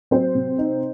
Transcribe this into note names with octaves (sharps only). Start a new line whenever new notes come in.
F#3 C4 C5
C3
D#4